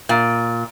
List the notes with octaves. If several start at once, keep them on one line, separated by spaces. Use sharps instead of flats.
A#2